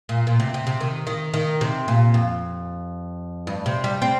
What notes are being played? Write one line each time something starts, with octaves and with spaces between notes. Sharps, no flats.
A#2
A#2
C3
C3
C3
D#3
D#3
D#3
C3
A#2
F2
G2
C3
G3
C4